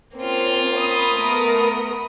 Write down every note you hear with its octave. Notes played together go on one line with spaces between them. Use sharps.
A#3 C4 C#4 F4
B5 D#6
A3 B3 A#4